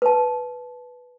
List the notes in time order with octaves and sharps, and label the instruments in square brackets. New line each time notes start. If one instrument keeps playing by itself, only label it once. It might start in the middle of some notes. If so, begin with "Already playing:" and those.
[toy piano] B4 A5